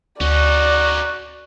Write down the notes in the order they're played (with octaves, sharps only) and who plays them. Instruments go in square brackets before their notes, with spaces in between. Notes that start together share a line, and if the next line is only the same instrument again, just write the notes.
[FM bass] D2 [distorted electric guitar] C#4 D#4 [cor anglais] F#4 [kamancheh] D5